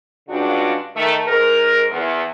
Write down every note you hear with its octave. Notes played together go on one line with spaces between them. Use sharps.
G2 C#3 G#3 D4 F4 F#4
D#3 A3
G#2 A#4
E2